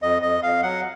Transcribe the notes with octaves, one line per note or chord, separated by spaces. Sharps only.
F2 D#5
F2 D#5
F2 F5
F#3 F#5